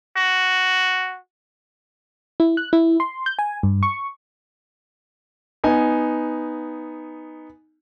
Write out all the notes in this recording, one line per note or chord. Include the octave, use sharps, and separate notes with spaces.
F#4
E4
F#6
E4
C6
G6
G#5
G2
C#6
B3 D#4 G#5